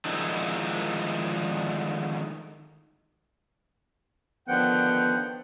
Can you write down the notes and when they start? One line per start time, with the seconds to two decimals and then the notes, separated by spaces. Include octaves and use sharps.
0.05 D3 D#3 F3 G#3 D#4 E4
4.48 D3 D#3 F3 B3 F#5 G5